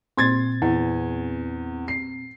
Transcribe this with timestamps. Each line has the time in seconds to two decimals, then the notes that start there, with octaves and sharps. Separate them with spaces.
0.17 A#2 C4 C6 G#6 A6
0.62 E2
1.88 C7